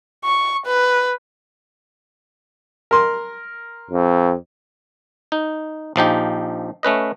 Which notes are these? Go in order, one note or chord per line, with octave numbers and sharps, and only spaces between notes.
C#6
B4
A#4 C6
F2
D#4
A#1 F3 D#4 G4
A3 C#4 B4 D#5